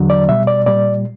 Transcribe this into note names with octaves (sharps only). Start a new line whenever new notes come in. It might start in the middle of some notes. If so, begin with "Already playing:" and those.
Already playing: E2 D3 F#3
D5
B2 G3 E5
D5
A#2 G3 D5